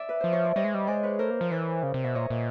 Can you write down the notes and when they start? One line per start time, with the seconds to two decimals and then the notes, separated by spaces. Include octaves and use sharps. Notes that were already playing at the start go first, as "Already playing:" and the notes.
Already playing: D5 E5
0.09 B4
0.20 F3 C5
0.32 C#5
0.44 D5
0.56 G3 C#5 D#5
0.64 G#3
0.74 G3
0.87 G#3 C5 D5
1.03 B4 C#5
1.19 A3 A#4 C5
1.30 A#3
1.41 F3
1.51 E3 C5 D5
1.83 C#3
1.94 C3
2.04 B2 E5
2.15 A#2 C#5 D#5
2.30 A#2